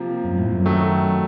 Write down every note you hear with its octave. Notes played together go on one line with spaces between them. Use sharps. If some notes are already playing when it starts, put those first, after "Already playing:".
Already playing: C3 F3 A#3
F#2
A2
F#2
D#3 F#3 A3